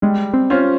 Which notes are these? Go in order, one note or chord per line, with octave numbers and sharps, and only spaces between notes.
G3 G#3
C4
C#4 F4 C5